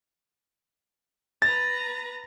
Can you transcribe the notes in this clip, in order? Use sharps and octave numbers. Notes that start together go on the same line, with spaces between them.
B4 A#5 A6